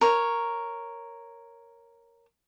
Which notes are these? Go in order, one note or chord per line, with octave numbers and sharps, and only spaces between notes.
A#4 C#5